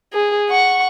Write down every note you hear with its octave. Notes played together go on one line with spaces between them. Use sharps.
G#4
F#5 C#6